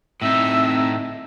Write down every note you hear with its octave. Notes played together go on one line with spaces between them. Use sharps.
A2 C4 D#4 E5